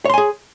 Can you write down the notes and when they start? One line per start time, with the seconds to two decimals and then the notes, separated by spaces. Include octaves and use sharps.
0.05 C#5
0.10 C6
0.14 G#5
0.18 G#4